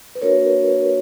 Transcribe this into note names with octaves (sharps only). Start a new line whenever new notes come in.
B4
A#3 D4 F#4 A#4 C#5